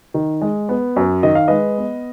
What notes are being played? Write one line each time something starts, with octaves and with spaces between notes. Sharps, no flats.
D#3
G#3
B3
F#2
D#3 D#5
F5
G#3 B4 D#5
B3